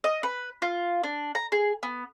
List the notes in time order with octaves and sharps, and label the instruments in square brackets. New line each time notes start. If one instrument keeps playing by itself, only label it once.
[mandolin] D#5
B4
F4
D4
A#5
G#4
B3